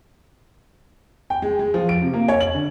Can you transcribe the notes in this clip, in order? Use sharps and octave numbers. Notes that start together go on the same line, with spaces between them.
G5
G#3
G#3
F3
D7
C3
A#3
C#5
F#7
D3